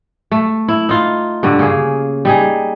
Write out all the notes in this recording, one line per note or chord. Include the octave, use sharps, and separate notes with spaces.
A3
E4
D#4 F4
G2 D3
C#3 A#3 G#4
G3 D#4 G#4